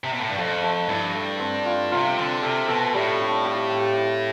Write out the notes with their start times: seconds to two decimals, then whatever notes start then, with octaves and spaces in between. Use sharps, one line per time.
0.04 C3
0.12 B2
0.21 A2
0.29 G2
0.38 F2 A3
0.63 A3
0.89 G2 E4
1.15 A3
1.40 C4
1.66 F4
1.92 C3 F4
2.18 D3 C4
2.43 C3 A4
2.69 B2 A4
2.94 A2 G3
3.20 D4
3.45 G4
3.71 G4
3.97 E4